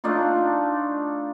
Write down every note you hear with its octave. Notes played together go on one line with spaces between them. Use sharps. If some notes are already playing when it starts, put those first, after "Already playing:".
A3 D4 D#4 F4